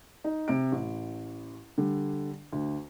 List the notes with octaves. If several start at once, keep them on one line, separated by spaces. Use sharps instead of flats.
D#4
C3 D7
A1
D3 G3
D2